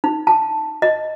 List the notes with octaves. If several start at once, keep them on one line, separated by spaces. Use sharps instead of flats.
D#4
A5
D#5